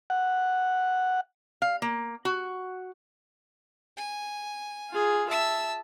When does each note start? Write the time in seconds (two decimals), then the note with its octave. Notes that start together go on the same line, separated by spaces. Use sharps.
0.10 F#5
1.62 F5
1.82 A#3
2.25 F#4
3.97 G#5
4.90 F4 G#4
5.29 E5 A5 E6